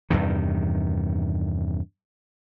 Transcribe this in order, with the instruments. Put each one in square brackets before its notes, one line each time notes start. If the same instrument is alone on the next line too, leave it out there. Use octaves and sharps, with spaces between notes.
[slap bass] E2 G2 C3 D#3